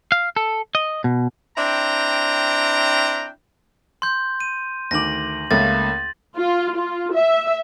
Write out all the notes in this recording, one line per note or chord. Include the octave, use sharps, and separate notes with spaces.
F5
A4
D#5
B2
C4 D4 E4 G5 A#5
C6 G6
D#7
D2 D#3 D6 A#6 F#7
C#2 A3 A#3 A6
F4
F4
E5